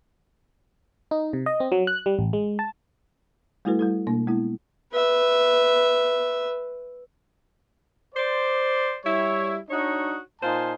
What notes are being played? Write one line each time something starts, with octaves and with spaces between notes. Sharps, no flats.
D#4
C3
D#5
C4
F#3
F#6
G3
A1
G#3
A5
G3 A3 E4 F#4 A4 B4
G3 E4 A4
B2 A#3 D4
G#3 B3 E4
B4 E5
C5 D5
G3 E4 C#5
D4 D#4 F#4 C#5 D#5
A#2 D#4 F4 C5 G#5 A5